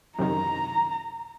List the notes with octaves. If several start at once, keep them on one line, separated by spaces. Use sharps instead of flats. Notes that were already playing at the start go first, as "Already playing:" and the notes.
F#2 C3 D#3 A#5